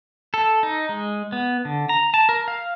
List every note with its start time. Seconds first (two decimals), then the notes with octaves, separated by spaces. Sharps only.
0.34 A4
0.63 D#4
0.89 G#3
1.32 B3
1.65 D3
1.89 A#5
2.14 A5
2.29 A#4
2.48 F5